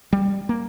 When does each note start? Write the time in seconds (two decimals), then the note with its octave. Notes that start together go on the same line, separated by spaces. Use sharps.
0.13 G3
0.49 A#3